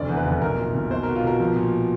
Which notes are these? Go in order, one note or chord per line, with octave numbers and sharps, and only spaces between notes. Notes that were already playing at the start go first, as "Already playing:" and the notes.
Already playing: F1 D2 D5
E2
B4
F1
B1 A#4
A#2
B1
B2 C5
B2 A#4
F4
B2 A#4
F3
A#2